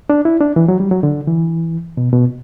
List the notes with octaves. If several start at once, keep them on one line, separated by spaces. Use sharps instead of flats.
D4
E4
D4
E3
F#3
G3
F#3
D3
E3
B2
B2